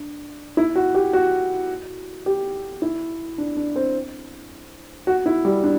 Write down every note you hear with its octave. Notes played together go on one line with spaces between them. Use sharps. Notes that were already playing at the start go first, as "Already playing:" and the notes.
Already playing: D4
E4
F#4
G4
F#4
G4
E4
D4
D4
C4
F#4
E4
G3
D4